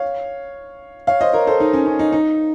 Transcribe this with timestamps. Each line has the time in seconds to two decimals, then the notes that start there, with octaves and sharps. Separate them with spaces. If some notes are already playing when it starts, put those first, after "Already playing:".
Already playing: C#5 F5
1.07 C#5 F5
1.21 C5 D#5
1.33 A#4 C#5
1.47 A4 C5
1.60 D#4
1.73 C#4
1.86 C#4
1.99 D#4
2.13 D#4